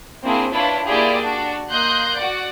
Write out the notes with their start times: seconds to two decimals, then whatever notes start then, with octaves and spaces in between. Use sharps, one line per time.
0.23 A#3 C4 D4 E4 G#4 C5
0.52 D4 E4 F4 B4 C#5
0.86 A#3 E4 F4 G4 G#4 D5
1.21 D4 F#4
1.70 A#3 D#5 C6 F#6 G6 A#6
2.18 F#4 D5 F#5